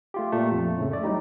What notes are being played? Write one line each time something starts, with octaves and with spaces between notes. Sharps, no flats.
A3 F4 G4
A#2 A3
F2
A2 C#3 A3
A3 D5
F#3 G3 D#4 E4 G4